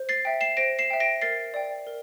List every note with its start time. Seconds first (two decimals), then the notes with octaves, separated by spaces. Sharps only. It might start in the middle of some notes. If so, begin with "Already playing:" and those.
Already playing: C5
0.09 A6 C7
0.25 E5 G5
0.41 C7 E7
0.57 C5 A#6 D7
0.79 C7 E7
0.90 E5 G5
1.00 A#6 D7
1.22 A#4 A6 C7
1.54 D5 G5
1.87 A#4